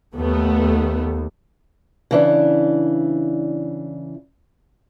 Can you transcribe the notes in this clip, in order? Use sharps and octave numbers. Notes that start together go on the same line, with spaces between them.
D#2 A3 B3
C#3 E3 D4